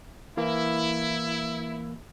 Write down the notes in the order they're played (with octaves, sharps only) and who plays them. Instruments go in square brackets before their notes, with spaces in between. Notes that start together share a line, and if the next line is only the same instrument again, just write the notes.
[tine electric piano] E3 A#3 [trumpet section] E4